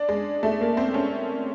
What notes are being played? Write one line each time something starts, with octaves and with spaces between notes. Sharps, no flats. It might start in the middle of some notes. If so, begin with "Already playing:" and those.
Already playing: D4
G#3
A3
A#3
C4
C#4